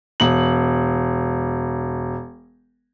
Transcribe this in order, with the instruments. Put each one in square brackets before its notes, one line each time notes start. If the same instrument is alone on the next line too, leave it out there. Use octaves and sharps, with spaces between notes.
[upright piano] E1 F#7